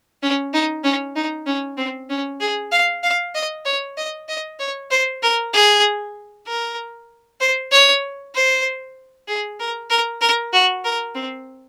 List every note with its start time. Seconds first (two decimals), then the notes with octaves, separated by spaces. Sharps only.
0.22 C#4
0.53 D#4
0.84 C#4
1.16 D#4
1.46 C#4
1.77 C4
2.10 C#4
2.40 G#4
2.72 F5
3.03 F5
3.35 D#5
3.65 C#5
3.97 D#5
4.29 D#5
4.59 C#5
4.91 C5
5.22 A#4
5.53 G#4
6.47 A#4
7.40 C5
7.71 C#5
8.35 C5
9.28 G#4
9.60 A#4
9.90 A#4
10.21 A#4
10.53 F#4
10.85 A#4
11.15 C4